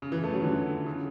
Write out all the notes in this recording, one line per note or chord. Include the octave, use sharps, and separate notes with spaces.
C#3
E3
A3
F#3
D3
C#3